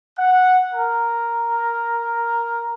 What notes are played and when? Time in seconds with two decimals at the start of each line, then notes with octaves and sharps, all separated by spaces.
0.17 F#5
0.73 A#4